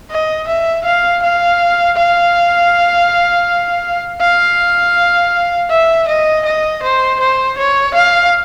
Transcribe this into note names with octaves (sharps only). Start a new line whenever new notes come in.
D#5
E5
F5
F5
F5
F5
E5
D#5
D#5
C5
C5
C#5
F5